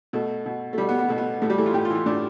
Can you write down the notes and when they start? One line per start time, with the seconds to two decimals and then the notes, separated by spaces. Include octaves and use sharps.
0.13 B2 A3
0.46 B2
0.73 A3
0.78 B2 G3
0.89 B3
0.99 B3
1.08 B2 A3
1.18 B3
1.42 A2 A3
1.50 G3
1.58 E3 A3
1.66 F4
1.74 A2 G4
1.85 F4
1.90 E3
1.95 F4
2.06 A2 D4